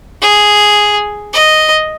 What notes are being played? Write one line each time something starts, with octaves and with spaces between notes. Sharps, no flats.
G#4
D#5